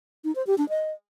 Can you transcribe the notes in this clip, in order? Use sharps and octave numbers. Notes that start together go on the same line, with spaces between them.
D#4
C5
G4
D4
D#5